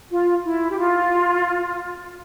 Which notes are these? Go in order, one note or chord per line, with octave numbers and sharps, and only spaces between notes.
F4
E4
G4
F4